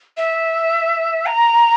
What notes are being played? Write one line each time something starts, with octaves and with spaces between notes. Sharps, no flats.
E5
A#5